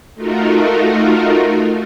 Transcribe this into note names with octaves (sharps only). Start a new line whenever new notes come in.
A3 D#4 F4 F#4 A#4